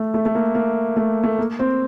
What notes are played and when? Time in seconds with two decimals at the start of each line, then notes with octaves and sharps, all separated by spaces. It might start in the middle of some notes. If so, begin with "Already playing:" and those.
Already playing: A3
0.14 A3
0.25 A3
0.35 A#3
0.55 A#3
0.96 A3
1.24 A3
1.38 A#3
1.59 C4